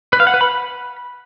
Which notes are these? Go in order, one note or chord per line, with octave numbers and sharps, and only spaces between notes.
B4
F5
F#5
B4
B5